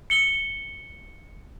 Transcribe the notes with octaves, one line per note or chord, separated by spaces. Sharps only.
C#7 G7